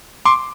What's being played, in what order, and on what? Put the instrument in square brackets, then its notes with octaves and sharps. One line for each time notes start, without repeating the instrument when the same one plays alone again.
[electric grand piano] C6 D6